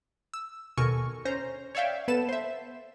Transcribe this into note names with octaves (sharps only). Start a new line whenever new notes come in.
E6
D#2 B2 A4 A#4 G#5 C#6
C#4 C5 A#5
C#5 D5 E5 F5 G5
B3 A4 B4 A5 E7
C5 E5